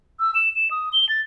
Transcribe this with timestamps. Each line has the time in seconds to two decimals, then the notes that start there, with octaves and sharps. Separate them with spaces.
0.20 E6
0.35 E7
0.56 E7
0.71 D#6
0.93 G7
1.09 A6